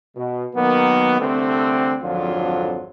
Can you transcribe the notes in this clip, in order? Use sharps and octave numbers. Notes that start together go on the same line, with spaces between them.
B2
D#3 F#3 A#3 B3
C2 D3 A3 C4
G#1 F2 D3 F3 F#3 F4